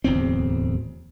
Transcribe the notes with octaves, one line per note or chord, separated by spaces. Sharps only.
D1 E2 C4